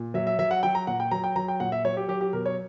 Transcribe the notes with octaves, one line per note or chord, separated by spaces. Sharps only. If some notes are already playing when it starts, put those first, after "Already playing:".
Already playing: A#2
F#3 E5
E5
F#3 E5
F#5
F#3 G5
A#5
A#2 F#5
G5
F#3 A#5
G5
F#3 A#5
G5
A#2 F#5
E5
F#3 C#5
G4
F#3 G4
G4
B2 A#4
C#5